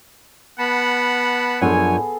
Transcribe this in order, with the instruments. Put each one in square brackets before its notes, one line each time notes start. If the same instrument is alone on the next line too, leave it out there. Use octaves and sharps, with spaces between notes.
[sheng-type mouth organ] B3 A5 B5 [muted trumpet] F#5
[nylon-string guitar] F#2 F3 D4 [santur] B3 G#4 A4 [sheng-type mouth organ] C#5 G#5